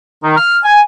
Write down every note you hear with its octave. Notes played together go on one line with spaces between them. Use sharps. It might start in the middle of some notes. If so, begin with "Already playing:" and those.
D#3
F6
G#5